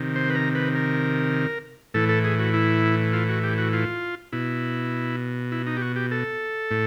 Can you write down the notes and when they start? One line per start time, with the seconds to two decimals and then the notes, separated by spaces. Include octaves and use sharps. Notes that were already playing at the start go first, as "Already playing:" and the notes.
Already playing: C3 D#3
0.16 C5
0.30 B4
0.35 A#4
0.55 B4
0.75 A#4
1.94 A2 E3 A4
2.09 A4
2.24 G#4
2.39 F#4
2.54 E4
3.13 F4
3.29 F#4
3.43 G4
3.58 F#4
3.73 F4
4.33 B2 E4
5.52 E4
5.67 D#4
5.77 G4
5.82 F#4
5.96 G4
6.11 A4
6.71 A2